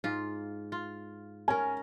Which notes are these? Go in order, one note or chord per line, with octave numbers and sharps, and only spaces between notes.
G#2 F4
F4
C#4 A#4 G#5